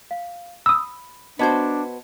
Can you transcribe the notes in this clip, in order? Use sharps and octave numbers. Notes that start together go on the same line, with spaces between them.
F5
B5 D#6 E6
B3 D4 F#4 C5 D#5 A5 G#6